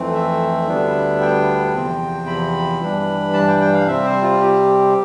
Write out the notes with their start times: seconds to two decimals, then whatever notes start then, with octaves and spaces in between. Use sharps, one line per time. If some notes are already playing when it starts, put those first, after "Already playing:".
Already playing: F2 E3 A3 C4
0.14 E5
0.68 D2 D3 G3 B3 D4
1.21 G5
1.74 E2 C3 F3 C4
2.27 B5
2.80 G2 E3 G3 D4
3.33 A5
3.48 G5
3.61 G5
3.73 F5
3.86 C3 G3 C4 E5
4.04 C5
4.23 F4
4.41 G4